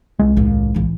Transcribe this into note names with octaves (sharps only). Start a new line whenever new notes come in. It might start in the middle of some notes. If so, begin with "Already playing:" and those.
C2 G#3
D#2 A2
A1 E3